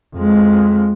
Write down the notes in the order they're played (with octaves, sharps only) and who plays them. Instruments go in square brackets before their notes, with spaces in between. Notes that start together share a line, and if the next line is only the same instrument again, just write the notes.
[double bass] F2 G#3